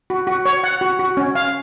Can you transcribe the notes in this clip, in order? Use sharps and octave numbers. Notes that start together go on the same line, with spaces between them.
F#4
F#4
C#5
F#5
F#4
F#4
C#4
F5